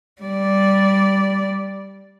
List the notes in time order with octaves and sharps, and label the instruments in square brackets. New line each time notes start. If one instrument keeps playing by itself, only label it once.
[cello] G3 D5